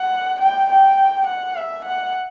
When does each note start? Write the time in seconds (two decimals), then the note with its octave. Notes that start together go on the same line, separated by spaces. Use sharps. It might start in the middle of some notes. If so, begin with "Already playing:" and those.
Already playing: F#5
0.41 G5
0.70 G5
1.27 F#5
1.55 E5
1.85 F#5